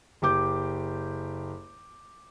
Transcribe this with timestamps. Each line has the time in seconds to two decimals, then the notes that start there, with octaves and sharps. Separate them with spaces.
0.22 F#1 G4 D6 G6